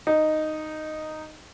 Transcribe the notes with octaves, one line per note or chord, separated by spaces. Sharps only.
D#4